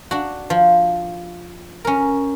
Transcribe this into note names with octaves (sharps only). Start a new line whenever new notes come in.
D4 F#4
F3
C#4 A#4